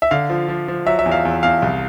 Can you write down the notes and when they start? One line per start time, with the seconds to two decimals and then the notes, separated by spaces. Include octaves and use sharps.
0.02 E5
0.11 D3 F5
0.30 F3
0.48 F3
0.68 F3
0.86 F#3 E5
0.99 E5
1.06 E2
1.11 F5
1.25 E2
1.43 E2 F5
1.62 C2